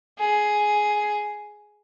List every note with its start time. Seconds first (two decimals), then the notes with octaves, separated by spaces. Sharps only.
0.19 G#4